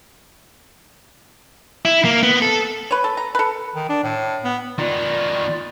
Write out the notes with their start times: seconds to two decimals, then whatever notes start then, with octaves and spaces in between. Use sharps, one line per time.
1.85 E4
2.05 A#3
2.23 B3
2.42 A4
2.91 B4 C#5
3.04 A4
3.17 A#5
3.35 A4 B4
3.75 D#3
3.89 D4
4.04 A2
4.44 B3
4.78 D#3 B3 F4 D5